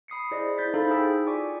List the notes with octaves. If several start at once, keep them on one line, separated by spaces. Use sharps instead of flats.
B5 D#6 C7 C#7
E4 G#4 C5 D5 D#5
E4 G6 A6 B6
D#4 E4 A4 C5 F5 B5
D#4 G#4 G5 E6 B6
F4 D5 G#5 C#6 D6